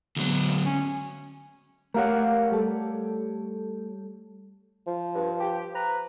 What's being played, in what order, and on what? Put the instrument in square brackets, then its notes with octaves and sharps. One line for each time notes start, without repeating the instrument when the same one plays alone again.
[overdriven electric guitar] D2 F#3 [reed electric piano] D3 G#3 B3
[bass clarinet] C#4
[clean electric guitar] A3 G4 C#5 [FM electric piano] A#4 F5 F#5
[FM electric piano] G3 A4
[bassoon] F3
[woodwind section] G2
G4
B4 A#5